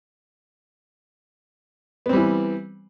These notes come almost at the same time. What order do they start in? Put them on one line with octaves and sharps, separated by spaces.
B3 C4 G3 E3